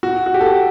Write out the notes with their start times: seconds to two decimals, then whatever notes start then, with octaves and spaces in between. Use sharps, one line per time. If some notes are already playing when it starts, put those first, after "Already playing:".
0.03 F#4
0.26 F#4
0.34 G4
0.41 A4